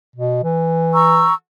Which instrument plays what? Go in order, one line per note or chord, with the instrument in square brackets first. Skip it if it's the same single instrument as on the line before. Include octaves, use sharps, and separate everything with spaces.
[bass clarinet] B2
E3
[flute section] A#5 C#6 E6